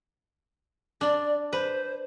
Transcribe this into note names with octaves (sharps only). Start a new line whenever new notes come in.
D4 D5
B4 C5